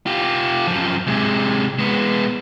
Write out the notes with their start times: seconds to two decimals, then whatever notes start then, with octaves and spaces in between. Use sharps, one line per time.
0.06 F4 G4
0.67 F#2 F3
1.07 C3 G#3
1.79 G#3 B3